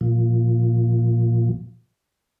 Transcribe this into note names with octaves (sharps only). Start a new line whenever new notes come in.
A#2 F3